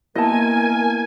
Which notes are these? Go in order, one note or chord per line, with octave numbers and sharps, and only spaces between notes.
A#3 B3 E4 A#4 D#5 G#5 A5